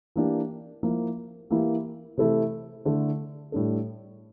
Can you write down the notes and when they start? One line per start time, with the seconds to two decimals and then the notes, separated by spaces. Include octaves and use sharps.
0.16 E3 A#3 D4 G4
0.83 F3 A#3 E4
1.50 E3 A#3 E4 G4
2.17 C3 E3 A3 E4 A4
2.85 D3 A3 E4 A4
3.52 A2 G3 D4 A4